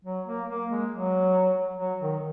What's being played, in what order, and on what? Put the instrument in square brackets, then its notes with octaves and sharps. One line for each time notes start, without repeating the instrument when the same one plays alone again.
[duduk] F#3
A#3
A#3
G#3
F#3
F#3
D#3